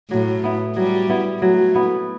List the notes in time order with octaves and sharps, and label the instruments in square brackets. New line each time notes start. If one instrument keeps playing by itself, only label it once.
[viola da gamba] A2 [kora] F#3
[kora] B3 E4
[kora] F#3 [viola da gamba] G3
[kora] B3 E4
[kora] F#3 [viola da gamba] A3
[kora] B3 E4